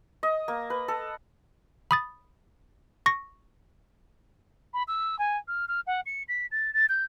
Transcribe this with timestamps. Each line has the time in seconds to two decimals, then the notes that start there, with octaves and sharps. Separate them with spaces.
0.23 D#5
0.48 A#3
0.70 B4
0.88 A4
1.91 B5 D#6 A6
3.06 C#6 A#6
4.74 B5
4.88 E6
5.19 G#5
5.48 F6
5.68 F6
5.87 F#5
6.06 C#7
6.28 B6
6.52 A6
6.74 A6
6.89 G6